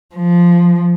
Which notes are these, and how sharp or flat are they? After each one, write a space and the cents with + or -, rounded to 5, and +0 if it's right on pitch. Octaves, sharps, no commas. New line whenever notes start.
F3 -5